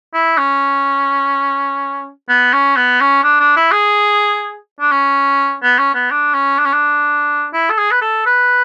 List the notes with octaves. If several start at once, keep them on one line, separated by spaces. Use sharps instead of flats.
E4
C#4
B3
C#4
B3
C#4
D4
D4
E4
G#4
D4
C#4
B3
C#4
B3
D4
C#4
D4
C#4
D4
E4
A4
G#4
B4
A4
B4